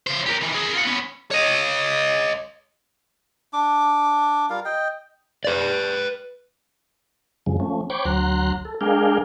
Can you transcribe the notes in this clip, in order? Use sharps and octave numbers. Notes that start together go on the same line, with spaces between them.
C#3 C5
G4 A#4
D#3 E3
G#4 A#4
F4 F#5
B3 C#4
C#5 D#5
D4 D6
G3 F4 A#4 F5
D#5 G5
B4 D5
F#2 C#3 F3 G#3
F3 A3 C#4
C5 C#5 G5 B5 C#6 D6
D2 F#3 A#5 C6 F#6
A4
G#3 D4 G#4 A#4 F5 G5